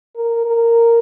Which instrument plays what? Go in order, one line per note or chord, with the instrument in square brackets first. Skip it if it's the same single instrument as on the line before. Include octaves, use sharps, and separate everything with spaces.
[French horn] A#4
A#4